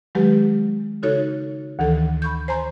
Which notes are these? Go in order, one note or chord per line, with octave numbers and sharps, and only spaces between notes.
D#3 F#3 G#3 G4 B4
C#3 D#4 F#4 A4 C#5
D2 D#3 E3 A4
B5 C#6 G6
C5 G#5 A#5 C6